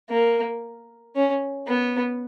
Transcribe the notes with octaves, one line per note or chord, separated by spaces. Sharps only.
A#3
C#4
B3